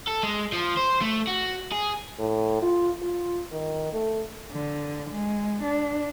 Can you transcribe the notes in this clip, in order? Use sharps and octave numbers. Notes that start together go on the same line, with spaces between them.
A4
G#3
F3
C5
A3
F#4
G#4
A2
F4
F4
D#3
A3
D3
G#3
D4